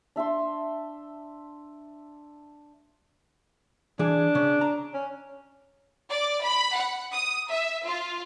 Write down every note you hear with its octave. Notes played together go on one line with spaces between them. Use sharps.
D4 E5 A5 C6
E3 D4 G#4
C#3
A#5
C#4
D5
B5
F#5
D#6
E5
F4